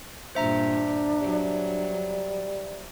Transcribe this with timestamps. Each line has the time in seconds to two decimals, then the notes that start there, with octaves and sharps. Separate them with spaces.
0.35 G2 A#2 D4 C5 E5 A#5
1.22 F#3 G3